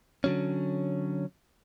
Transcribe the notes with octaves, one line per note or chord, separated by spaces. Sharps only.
D3 F#3 C#4